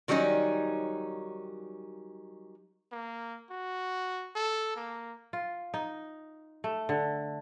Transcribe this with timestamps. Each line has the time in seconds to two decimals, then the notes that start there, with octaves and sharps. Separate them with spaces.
0.08 D#3 F#3 G3 C#4 D#4
2.92 A#3
3.50 F#4
4.36 A4
4.76 A#3
5.33 F4
5.74 D#4
6.64 A3
6.89 D3